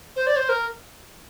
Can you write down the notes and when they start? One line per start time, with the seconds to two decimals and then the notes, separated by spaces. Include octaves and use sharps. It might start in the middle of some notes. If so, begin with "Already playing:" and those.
0.16 C5
0.27 D5
0.36 C5
0.49 A#4